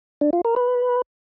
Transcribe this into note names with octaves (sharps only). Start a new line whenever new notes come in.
D4
F4
A#4
B4